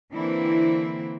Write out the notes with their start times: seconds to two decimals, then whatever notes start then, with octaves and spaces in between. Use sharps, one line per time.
0.12 D3 E3 A#3 C4 E4